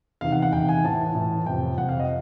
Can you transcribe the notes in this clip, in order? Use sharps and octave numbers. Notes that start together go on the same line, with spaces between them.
E2 C3 D#3 F5
F#5
F#5
E2 C3 D#3 G5
G#5
A2 E3 A5
A2 E3
F2 C3 F3 G5
F2 C3 F3 F#5
F5
D#5